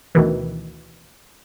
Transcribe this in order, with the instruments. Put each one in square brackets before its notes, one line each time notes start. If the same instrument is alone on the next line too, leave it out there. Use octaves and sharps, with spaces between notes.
[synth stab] D2 B2 D#3 E3